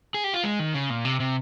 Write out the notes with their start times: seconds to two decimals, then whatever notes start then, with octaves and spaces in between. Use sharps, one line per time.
0.14 G#4
0.24 G4
0.34 F4
0.44 G#3
0.59 D#3
0.74 C#3
0.90 A#2
1.05 C3
1.20 C3